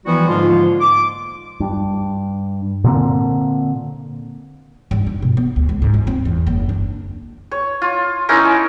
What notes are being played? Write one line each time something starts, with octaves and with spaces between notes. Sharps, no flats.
E3 F3 G3 B3 E4 F#4
G#2 D3 F3 G#3 A#3 F4
D6
G2
A#2 D3 A#3 C4
G2
D4
B2
B3
D2
C#2
G#2
F4
C4
E2
F#1
D4
C#5
F4
C#4 D#4 E4 A#4
A5